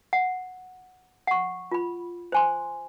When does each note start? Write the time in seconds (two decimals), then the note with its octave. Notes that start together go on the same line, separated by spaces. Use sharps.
0.13 F#5
1.27 F#5 C#6
1.71 F4 B5
2.32 C5 G#5 C6